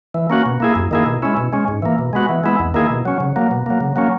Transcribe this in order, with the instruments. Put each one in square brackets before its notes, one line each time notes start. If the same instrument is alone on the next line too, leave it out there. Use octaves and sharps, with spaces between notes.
[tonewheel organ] E3
A#3 C#4 F#4
B2
A#3 E4 G#4
F#2
D#3 A#3 E4 G#4
B2
G#3 C#4 E4
B2
G#3 C#4
G#2
E3 A#3
B2
G#3 B3 F#4
E3
G#3 B3 E4
E2
D#3 A#3 E4 G#4
B2
F#3 C#4
C#3
F#3 A#3
B2
F#3 A#3
C#3
F#3 A#3 C#4